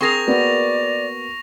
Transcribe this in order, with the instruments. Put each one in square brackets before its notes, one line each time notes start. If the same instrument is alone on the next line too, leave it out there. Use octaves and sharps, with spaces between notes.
[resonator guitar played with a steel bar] C4 G#4 A#4 [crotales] C#6 A#6 F7
[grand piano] A#3 B3 F#4 [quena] D5